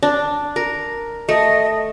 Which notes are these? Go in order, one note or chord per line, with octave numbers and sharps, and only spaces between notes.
D4
A#4
A3 D#5